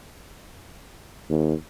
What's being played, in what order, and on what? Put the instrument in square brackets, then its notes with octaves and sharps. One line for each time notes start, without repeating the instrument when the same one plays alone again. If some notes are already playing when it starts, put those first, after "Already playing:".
[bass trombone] D#2